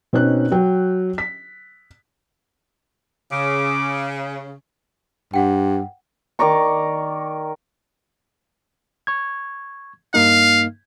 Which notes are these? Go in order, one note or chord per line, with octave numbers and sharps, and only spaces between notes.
B2 C4 C#4 D#4 F#6
F#3 F#4 G5
B6
C#3 D6
G2 F#5 G5
D#3 D5 A#5 C#6
C#6 G#6
G2 A#3 D#4 F5